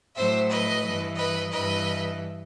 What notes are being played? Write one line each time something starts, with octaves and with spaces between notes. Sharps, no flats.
A2 F#3 C5 E5
B4 D#5
G2 E3
B4 D#5
G2 E3 B4 D#5